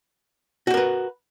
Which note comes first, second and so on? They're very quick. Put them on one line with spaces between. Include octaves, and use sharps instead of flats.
F#4 G4 A#4 B4